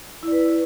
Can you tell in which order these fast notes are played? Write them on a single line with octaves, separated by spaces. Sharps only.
E4 D5 B4